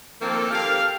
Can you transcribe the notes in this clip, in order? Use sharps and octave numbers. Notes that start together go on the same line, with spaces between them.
D#3 F3 A#3 C4 A4
G4 A4 A#4 F5